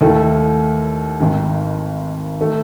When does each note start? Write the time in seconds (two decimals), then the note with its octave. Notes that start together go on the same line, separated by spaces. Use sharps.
0.01 D#2 D#3 A3 E4
1.20 G#1 G#2 D#3
2.40 D#3 A3